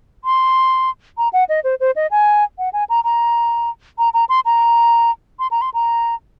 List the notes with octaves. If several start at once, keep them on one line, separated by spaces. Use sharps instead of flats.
C6
A#5
F#5
D#5
C5
C5
D#5
G#5
F#5
G#5
A#5
A#5
A#5
A#5
C6
A#5
C6
A#5
C6
A#5